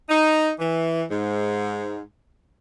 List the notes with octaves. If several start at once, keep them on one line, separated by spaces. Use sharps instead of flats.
D#4
E3
G#2